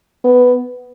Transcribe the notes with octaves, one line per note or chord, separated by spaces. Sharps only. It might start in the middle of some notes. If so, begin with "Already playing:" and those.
B3